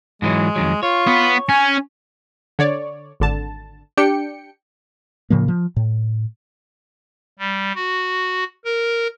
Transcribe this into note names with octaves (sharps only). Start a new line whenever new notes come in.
G#2 E3 F#3 G#3
F2 D#3 F#3
F4 C#5
B3
C#4 G#5
D3 C#5 D5
G#1 D3 A5
D4 G4 G5 C#7
A2 C#3 F3 A#3
F3
A2
G3
F#4
A#4